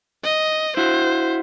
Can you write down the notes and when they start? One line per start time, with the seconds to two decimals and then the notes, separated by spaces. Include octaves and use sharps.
0.24 D#5
0.77 E4 F#4 C5